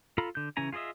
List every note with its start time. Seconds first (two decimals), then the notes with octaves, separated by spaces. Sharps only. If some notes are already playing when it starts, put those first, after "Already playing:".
0.18 F4 A4 F5 A#5 B5
0.35 D3 G6
0.57 C#3 E3 C#4 G#5 A#5
0.73 F4 G#4 A4 D#5 E5